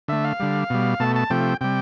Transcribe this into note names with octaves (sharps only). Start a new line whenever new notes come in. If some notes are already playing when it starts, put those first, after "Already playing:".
D3 A3 E5
F5
D3 G3
B2 G3
B2 A3 A5
A5
C3 F3 A3 G5
C3 G3 G5